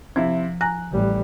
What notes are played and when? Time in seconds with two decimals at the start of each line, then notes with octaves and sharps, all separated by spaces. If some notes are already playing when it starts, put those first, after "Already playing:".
0.16 C3 F3 E4
0.61 G#5 A#5 F#6 A#6
0.91 A1 G3